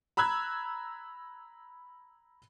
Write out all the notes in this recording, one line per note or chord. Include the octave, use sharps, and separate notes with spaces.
A#5 B5 E6 F#6 G#6